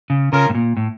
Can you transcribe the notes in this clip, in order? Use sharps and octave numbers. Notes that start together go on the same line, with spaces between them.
C#3
C#3 C#4 F4 A#4
A2
A#2
A2